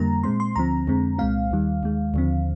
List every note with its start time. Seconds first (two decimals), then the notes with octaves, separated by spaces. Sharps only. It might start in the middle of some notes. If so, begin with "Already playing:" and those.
Already playing: F2 D3 G3 A#3 A#5
0.23 A#2 G#3 C4 C6
0.40 C6
0.56 D2 D3 F3 C4 A#5
0.87 F2 D3 G#3 C4
1.18 C2 A#2 G#3 C4 F5
1.51 D#2 D#3 G3
1.83 D#2 D#3 G#3
2.14 D#2 D3 F3 C4